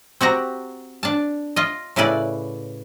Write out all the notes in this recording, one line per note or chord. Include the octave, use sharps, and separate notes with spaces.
C4 F#4 G4 A#5
D4 A5
F4 D#5
A2 C#3 E4 B4 D5